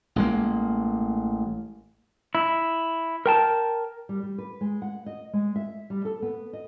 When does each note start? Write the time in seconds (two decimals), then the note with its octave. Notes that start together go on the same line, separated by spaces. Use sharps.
0.16 A1 G#3 A#3
2.35 E4
3.26 A#4 G5 A5
4.09 G3
4.23 G3
4.38 B4
4.61 G#3
4.82 F#5
5.06 D#5
5.33 G#3
5.56 E5
5.90 G3
6.05 A4
6.22 B3
6.53 D#5